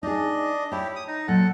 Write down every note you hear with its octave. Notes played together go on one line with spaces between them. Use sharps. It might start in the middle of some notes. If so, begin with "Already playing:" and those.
D4 D#4 G#4 D#5
E4 G4 C#5 A5
D#6
D#4
A#2 F#3 A4 F#5